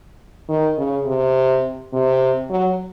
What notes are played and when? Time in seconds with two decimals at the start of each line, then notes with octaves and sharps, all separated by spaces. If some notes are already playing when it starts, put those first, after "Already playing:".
0.49 D#3
0.78 C#3
1.06 C3
1.93 C3
2.50 F#3